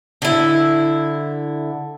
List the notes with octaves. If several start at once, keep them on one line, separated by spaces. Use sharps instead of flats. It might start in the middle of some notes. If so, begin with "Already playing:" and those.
D3 E4